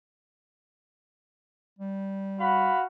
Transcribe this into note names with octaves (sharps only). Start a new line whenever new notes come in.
G3
F#4 F5 B5